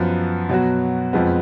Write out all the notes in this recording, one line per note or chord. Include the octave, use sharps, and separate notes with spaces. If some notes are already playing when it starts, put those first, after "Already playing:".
Already playing: F#2 F3 B3
B2 F#3 B3 F#4
F2 F3 G#3 B3